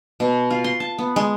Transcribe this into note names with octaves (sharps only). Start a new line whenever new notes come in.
B2
F4
C6
A5
B3
G#3